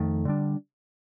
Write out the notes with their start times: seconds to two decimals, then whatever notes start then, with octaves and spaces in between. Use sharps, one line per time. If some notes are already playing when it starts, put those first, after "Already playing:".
Already playing: F2 D#3 A3
0.25 D3 G3 D4